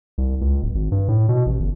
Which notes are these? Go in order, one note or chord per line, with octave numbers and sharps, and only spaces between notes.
C2
C#2
D1
G#1
G2
A2
B2
A1
G1